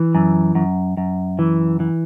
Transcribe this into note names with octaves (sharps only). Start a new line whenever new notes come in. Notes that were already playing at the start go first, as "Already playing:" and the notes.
Already playing: E3
F#2
F#2
F#2
E3
E3